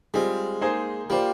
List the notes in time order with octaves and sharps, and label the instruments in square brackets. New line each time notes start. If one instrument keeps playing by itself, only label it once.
[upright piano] G3 C4 F4 [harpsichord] G#3
[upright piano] A#3 D#4 G#4 C5
[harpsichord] G3 [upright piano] A#3 F4 C5